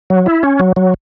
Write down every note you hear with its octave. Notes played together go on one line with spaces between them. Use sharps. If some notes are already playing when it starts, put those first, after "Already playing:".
F#3
E4
C#4
F#3
F#3